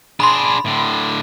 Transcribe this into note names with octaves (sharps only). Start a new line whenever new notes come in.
D4 G#4 B5 C6
A2 D3